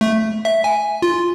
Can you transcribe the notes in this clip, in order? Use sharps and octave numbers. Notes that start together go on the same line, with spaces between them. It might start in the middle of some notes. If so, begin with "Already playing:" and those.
A3
E5
G#5
F4